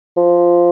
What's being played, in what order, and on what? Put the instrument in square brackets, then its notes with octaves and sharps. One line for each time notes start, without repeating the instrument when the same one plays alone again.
[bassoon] F3